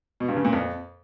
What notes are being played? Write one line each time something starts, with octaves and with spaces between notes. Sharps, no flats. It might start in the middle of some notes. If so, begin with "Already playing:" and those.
B2
G2
C#3
A#2
F2